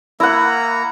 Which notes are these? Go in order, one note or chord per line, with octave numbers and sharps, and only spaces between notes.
A#3 E4 F#5 A#5